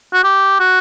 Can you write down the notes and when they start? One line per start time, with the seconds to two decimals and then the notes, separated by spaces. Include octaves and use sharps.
0.14 F#4
0.24 G4
0.60 F#4